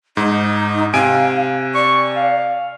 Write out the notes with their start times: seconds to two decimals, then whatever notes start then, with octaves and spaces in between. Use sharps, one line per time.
0.17 G#2 D#4
0.94 C3 F5 G#5 D7
1.75 D5 C#6
2.16 F5